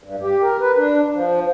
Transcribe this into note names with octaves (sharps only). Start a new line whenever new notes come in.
G2
G4
A#4
B4
D4
F3